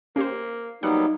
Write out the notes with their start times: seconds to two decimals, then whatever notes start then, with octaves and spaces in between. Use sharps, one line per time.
0.16 A#3 C#4 G4 C5
0.83 F#3 G3 A#3 B3 D#4 F#5